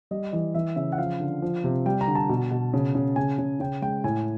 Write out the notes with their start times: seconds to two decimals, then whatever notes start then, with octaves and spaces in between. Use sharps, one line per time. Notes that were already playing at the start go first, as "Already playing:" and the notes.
0.11 G3 D#5
0.32 E3 D#5
0.54 E3 E5
0.76 C#3 E5
0.92 F#5
0.98 F3 F5
1.20 D3
1.42 F3
1.64 C3
1.86 G3 G5
2.01 A#5
2.08 D3
2.15 A5
2.29 B2
2.51 B2
2.74 C#3
2.95 C#3
3.16 C#3 G#5
3.39 C#3
3.60 C#3 G5
3.82 G#3 G5
4.04 A2 G#5